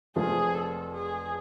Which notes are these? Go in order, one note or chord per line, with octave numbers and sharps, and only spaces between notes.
F1 F2 F3 A3 F4 G#4
A4
G#4